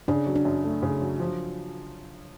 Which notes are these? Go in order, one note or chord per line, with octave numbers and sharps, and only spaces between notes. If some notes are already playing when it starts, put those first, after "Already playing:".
C#3 D4
F#3
D4
F#2
A3
C#3
F#3
F3